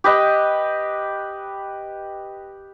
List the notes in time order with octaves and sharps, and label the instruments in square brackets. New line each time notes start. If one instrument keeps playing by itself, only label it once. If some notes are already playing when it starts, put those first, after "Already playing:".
[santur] G4 B4 D#5 G5